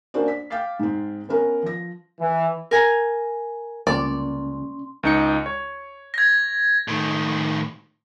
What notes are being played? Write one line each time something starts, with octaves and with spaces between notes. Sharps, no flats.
A#3 C#4 D4 F#4 C5 D5
B6
F5 G5 D6 F6 A6 C7
G#2 C4
B3 C#4 A#4 B4
F3 A#6
E3
A#4 G#5 A#5
C#2 C3 G3 A#3 C#4 D5 C6
C#2 D#4 C#7
C#5
G#6 A#6
A2 D#3